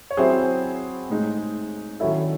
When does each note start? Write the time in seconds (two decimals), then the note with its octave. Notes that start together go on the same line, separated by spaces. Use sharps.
0.11 C#5
0.17 F#3 C4 E4 G#4 C5
1.09 A2 G#3 D#4
2.00 D#3 F#3 C#4 E4 A4